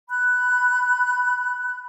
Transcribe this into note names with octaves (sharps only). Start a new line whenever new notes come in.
B5 F#6